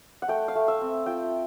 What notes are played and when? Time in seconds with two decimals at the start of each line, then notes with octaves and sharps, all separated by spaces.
0.22 F#5
0.28 A3 G5
0.48 F5
0.55 A3
0.68 E5
0.81 C4
1.06 F4 G5